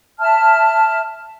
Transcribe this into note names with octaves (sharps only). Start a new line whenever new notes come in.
E5 A5 F6